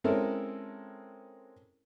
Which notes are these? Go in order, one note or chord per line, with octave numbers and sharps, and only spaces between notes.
G#3 C4 C#4 E4 A4 A#4